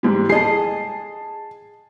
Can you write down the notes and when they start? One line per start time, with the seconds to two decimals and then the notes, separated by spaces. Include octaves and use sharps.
0.03 G#2 E3 G3
0.29 G#4 D#5 A5 C7